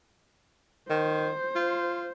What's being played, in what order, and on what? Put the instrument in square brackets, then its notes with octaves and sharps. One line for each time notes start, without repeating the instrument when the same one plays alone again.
[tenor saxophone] D#3 [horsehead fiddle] C5
[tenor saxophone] F4